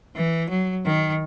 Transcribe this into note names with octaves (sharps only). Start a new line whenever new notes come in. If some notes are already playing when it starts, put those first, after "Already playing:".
E3
F#3
D#3